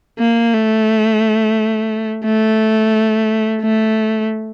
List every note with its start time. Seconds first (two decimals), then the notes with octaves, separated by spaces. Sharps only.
0.19 A#3
0.53 A3
2.24 A3
3.62 A3